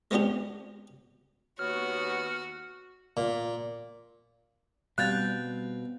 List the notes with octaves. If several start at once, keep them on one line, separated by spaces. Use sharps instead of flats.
G#3 B3 C4 D4 G4
D#2 B3 F#4 C#5 F6
A#2
B2 G3 C4 F5 F#6 G6 A6